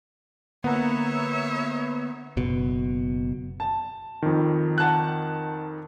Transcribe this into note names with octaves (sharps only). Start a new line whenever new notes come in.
D3 A#3 B3 C#5 E5 F#5 A#5
F#1 B2
A5
F2 D#3
F#5 A5 F#6